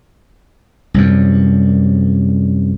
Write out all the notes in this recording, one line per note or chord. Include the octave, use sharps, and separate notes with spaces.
C2 F#2